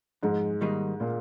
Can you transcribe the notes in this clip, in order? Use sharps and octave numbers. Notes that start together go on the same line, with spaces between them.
F2 G#2 G#3
D#3 G3 A#3 D#4
A#2 A#3